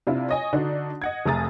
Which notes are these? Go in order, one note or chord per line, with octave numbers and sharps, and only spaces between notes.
C3 D4 E4 F4
C#5 D#5 G#5
D3 D4 D#4 F#4
D#5 F#5 G#6
F1 A3 G#4 A#5 D#6 A6